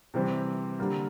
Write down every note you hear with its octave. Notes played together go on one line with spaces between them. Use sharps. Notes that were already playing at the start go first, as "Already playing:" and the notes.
C3 E3 G3 C4
D3 G3 A#3